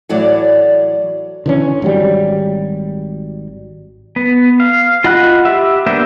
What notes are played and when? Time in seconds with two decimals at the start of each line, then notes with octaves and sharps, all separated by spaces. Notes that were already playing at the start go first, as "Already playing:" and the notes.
0.09 A2 E3 F#3 D5 F#5
1.46 D3 E3 C#4
1.82 G#1 F#3 G3
4.16 B3
4.60 F5
5.04 F4 D#5 F#5 B5 F#6
5.45 G4 E5
5.86 A#3 B3 D4 C5 E5